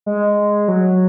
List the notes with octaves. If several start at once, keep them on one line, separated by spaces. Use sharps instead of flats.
G#3
F#3